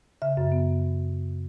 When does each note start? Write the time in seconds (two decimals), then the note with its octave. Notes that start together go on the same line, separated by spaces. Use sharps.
0.22 C#3 E5
0.37 F#2
0.52 B3